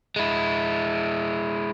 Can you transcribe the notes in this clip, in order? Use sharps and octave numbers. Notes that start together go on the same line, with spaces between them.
G#3 E4